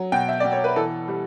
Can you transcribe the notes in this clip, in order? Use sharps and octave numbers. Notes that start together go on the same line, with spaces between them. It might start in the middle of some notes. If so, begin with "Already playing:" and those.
Already playing: F#3
B2 G5
E5
B2 D5
C#5
B4
E3 A4
G3